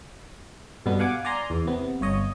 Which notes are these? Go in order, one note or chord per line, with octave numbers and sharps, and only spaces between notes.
G2 B2 D3 B3
F5 F#5 G#5 D6
D5 G#5 A#5 C6
E2
C3 B3
G1 C#5 D#5